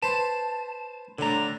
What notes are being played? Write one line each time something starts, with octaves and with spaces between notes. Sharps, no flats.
B4 C5 A5
A2 D3 D4 A#5